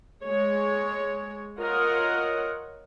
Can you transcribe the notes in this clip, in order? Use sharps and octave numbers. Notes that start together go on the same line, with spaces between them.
G#3 C#5
F4 A#4 C#5 D#5 F#5